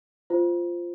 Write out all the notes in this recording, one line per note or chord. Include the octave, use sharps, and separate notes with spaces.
F4 C5